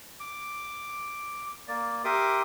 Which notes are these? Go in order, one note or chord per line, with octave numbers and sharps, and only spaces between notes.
D6
A#3 D5
G4 A#4 E5 C6 D6 D#6